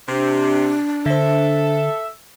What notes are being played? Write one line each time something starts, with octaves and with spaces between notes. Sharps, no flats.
C3 D4
D3 A4 C5 E5